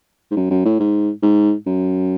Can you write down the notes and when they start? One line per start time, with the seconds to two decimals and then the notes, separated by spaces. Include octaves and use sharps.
0.31 G#2
0.36 F#2
0.50 F#2
0.65 A2
0.80 G#2
1.22 G#2
1.66 F#2